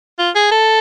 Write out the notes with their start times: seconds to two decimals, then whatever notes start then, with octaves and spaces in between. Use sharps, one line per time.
0.19 F4
0.35 G#4
0.51 A4